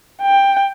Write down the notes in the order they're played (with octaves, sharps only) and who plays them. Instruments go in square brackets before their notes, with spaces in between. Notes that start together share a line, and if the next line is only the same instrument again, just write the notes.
[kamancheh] G5